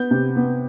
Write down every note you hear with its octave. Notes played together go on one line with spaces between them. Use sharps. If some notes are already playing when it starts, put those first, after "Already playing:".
Already playing: B3 G6
C3
B3